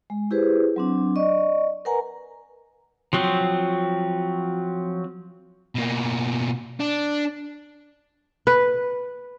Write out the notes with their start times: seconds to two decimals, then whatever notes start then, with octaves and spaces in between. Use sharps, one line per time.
0.10 G#3
0.31 E4 G4 G#4 B4 C5
0.76 F#3 C4 D4
1.16 D5 D#5 C#6
1.85 A#4 B4 F#5 G#5 A#5
3.13 F3 F#3 C4
5.75 B2 A#3
6.80 D4
8.47 B4